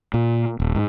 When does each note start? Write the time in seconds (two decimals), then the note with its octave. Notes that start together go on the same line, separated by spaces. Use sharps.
0.14 A#2
0.60 D#1
0.75 G#2